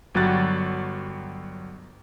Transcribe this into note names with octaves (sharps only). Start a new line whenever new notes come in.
G1 F#3 G3 F#4 F#6 A6